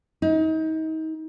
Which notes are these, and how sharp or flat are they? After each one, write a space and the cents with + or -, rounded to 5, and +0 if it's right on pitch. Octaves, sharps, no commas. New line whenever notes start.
D#4 +35